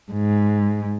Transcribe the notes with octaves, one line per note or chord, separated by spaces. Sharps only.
G#2